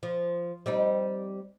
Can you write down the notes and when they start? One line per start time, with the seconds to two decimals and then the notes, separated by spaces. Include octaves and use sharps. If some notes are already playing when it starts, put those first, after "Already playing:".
0.03 F3
0.66 G3 C4 D#4